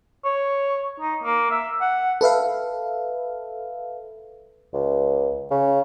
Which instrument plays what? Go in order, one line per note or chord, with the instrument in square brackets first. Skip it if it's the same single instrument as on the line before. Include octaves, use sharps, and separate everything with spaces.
[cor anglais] C#5
D#4
A#3
E5
F#5
[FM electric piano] A4 B4 E5 F5
[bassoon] C#2
C#3